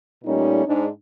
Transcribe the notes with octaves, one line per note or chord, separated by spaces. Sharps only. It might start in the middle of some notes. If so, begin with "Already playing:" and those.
A#2 G3 A3 C#4 D#4
G#2 D4